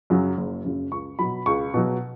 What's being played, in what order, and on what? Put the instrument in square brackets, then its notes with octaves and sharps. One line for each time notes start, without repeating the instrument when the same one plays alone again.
[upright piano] F#2 C#3 F#3
F#1
F#2 C#3 F#3
C#2 C#6
B2 F#3 B5
C#2 C#6
B2 F#3